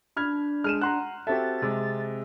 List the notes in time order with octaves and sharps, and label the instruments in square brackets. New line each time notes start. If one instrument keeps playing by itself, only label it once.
[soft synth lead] D4 [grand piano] B5 F6 G#6
[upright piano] G#3 [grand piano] F6 D#7 E7
[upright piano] F#5 [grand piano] A#5 C6 F#6
[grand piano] C4 E5 [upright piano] F#4 G4 A4 [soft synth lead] A6
[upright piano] C3 G#3